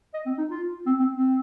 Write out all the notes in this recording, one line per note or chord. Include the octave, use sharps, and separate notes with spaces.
D#5
C4
D#4
F4
C4
C4
C4